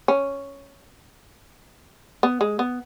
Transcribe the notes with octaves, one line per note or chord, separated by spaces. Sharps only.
C#4
B3
G#3
B3